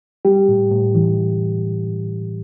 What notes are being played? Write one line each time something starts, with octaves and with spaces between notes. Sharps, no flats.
G3 G4
A2
A2
E3